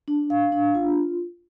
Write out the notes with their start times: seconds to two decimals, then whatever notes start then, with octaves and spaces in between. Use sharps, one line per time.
0.08 D4
0.30 F5
0.52 D4
0.75 F4